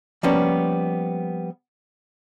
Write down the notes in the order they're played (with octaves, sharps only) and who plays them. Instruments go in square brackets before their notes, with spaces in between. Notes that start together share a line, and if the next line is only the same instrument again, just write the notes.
[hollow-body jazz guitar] F3 G3 A#3 B3 C#4